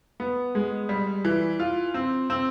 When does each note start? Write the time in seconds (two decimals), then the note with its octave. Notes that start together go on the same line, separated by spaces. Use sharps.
0.20 B3
0.55 G#3
0.89 G3
1.25 E3
1.60 F4
1.94 C4
2.30 C4